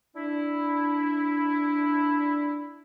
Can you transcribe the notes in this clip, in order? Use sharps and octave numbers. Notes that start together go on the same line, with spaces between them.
D4 E4